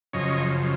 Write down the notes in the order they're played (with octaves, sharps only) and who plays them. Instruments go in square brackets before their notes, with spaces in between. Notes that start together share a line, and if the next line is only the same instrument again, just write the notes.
[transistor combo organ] F#2 C#3 F3 C#5 D#5